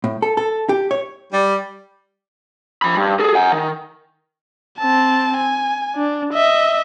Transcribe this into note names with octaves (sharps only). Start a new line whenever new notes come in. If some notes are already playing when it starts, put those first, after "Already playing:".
A2
A4
A4
G4
C#5
G3
F3 B5
G2
G#4 A4
F#5 G#5
D#3
C4 A5
G#5
D4
D#5 E5